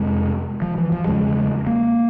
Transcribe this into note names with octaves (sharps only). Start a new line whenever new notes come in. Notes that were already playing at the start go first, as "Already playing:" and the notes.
Already playing: F2 C3 G#3
F3
E3
F3
E2 C#3 G#3
A#3